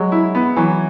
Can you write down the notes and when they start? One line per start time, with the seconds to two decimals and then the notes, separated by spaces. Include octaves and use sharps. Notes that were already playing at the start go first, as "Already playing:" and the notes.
Already playing: F#3 G#3
0.12 E4
0.35 B3
0.56 E3 F#3